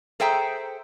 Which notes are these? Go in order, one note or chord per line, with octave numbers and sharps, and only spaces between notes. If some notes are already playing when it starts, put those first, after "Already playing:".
G#4 A4 C5 E5 G5 A#5